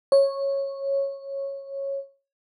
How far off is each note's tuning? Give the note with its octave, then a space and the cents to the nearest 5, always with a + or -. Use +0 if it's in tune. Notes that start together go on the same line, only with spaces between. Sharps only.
C#5 -10